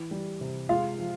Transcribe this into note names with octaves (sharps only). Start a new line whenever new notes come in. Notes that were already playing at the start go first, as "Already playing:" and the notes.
Already playing: E3
G3
C3
G#3 F4 F5
F3